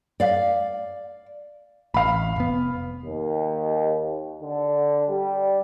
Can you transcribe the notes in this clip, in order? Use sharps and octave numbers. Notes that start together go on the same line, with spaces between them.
D5 F5
A1 F5 B5
F1 B3
D#2
D3
G3